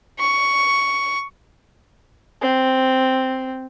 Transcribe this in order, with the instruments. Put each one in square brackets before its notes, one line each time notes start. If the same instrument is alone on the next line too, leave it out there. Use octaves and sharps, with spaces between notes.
[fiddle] C#6
[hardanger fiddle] C4